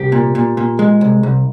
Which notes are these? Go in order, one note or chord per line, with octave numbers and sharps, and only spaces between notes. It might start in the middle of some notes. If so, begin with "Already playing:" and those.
Already playing: C2 G4
A#2
A#2
A#2
G#3
C2
C2